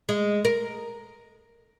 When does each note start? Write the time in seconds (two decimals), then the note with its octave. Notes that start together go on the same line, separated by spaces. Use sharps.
0.09 G#3
0.45 A#4